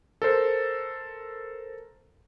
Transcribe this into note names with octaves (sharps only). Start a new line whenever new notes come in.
A4 A#4 C5